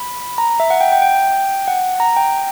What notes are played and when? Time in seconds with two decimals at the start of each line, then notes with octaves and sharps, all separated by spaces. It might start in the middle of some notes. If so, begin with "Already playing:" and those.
Already playing: B5
0.38 A#5
0.60 E5
0.70 F#5
0.81 G5
0.92 G5
1.02 G5
1.68 F#5
2.00 A#5
2.17 G5